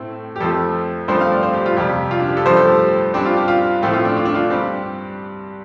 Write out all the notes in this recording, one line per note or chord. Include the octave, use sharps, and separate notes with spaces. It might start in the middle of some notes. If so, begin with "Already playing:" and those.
Already playing: A2 A3 C4
G4
F2 F3 A3 C4 A4
G2 F3 A3 C4 C5
F5
D5
C5
G4
F4
F2 C3 G3 G4
F4
D4
G4
A4
G2 F3 A3 C5
A4
G4
G2 G3 C4 D4
F4
G4
F4
A2 F3 A3 C4
F4
D4
F4
D4
F4
G2 G3 C4 G4